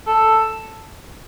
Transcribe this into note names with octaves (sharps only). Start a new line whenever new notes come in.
A4